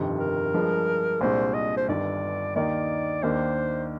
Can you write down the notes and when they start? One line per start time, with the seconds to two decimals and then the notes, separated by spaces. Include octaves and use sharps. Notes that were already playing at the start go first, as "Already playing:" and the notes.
Already playing: G1 F2 C3 D#3
0.20 A#4
0.54 G2 F3 G#3
1.21 C2 A#2 G#3 D4 C5
1.54 D#5
1.77 C5
1.89 G1 G2 D#3 D5
2.56 D#2 D#3 A#3 D#4 D5
3.23 D#2 D#3 A#3 D4 C5